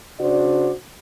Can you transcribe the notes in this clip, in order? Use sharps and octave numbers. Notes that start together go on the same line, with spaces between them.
C#3 D4 F#4 C5 D5